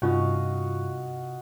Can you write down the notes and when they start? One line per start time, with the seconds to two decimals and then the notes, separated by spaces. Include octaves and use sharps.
0.02 G2 C3 C#4 D#4 F4 F#4 D#5 F5